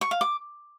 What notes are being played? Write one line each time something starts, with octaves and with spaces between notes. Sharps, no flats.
C#6
F5
D6